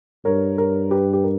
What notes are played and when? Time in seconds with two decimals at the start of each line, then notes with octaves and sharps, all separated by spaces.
0.25 G2 A#4 C#5
0.58 A#4 C#5
0.91 G4 B4
1.13 G4
1.24 A#4